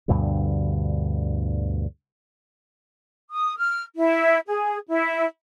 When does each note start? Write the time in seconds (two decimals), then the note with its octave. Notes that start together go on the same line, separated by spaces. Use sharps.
0.08 D2 G2 B2 D3
3.30 D#6
3.58 F6
3.96 E4
4.47 G#4
4.88 E4